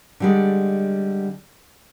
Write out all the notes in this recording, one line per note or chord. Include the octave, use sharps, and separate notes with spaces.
D3 G3 G#3